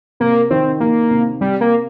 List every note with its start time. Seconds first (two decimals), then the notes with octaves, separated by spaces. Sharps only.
0.20 C3 A#3
0.50 D#3 C4
0.80 D#3 A#3
1.11 C3
1.41 C3 G3
1.61 A#3